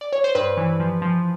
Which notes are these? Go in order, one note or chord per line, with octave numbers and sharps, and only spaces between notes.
D5
C#5
C5
G2 B4
E3
F3
F3